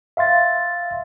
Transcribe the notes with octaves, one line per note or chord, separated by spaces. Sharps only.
E5 F5 C6 A6